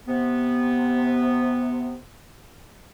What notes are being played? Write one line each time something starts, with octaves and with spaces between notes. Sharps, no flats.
C3 B3